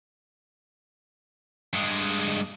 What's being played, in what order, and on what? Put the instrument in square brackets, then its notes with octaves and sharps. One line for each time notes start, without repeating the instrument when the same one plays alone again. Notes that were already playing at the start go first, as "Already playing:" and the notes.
[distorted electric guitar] G2 G#3